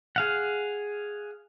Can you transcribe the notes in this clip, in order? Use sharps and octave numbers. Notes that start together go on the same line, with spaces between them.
G#4 F5 F#5